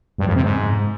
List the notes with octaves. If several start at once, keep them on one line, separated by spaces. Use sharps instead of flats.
G2
F2
C3
G#2